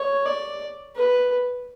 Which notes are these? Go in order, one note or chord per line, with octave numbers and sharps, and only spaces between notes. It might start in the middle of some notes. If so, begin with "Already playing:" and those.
Already playing: C#5
D5
B4